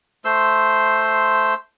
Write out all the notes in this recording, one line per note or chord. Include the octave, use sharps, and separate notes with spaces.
A3 C5 C6 E6